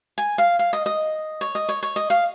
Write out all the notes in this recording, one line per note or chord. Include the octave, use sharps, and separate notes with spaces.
G#5
F5
F5
D#5
D#5
C#5
D#5
C#5
C#5
D#5
F5